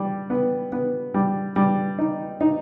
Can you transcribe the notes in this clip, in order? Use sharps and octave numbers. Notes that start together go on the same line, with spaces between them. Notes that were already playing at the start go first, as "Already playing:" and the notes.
Already playing: G3
B3
B3
G3
G3
D#4
D#4